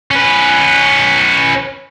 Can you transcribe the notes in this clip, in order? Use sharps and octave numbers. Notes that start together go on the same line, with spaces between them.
C#4 B4